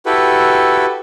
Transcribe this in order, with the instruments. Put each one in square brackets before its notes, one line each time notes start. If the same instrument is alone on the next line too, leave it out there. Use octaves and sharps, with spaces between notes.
[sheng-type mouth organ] E4 F#4 G4 A4 B4